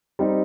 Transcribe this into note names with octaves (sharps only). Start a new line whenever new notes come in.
G3 C4 D#4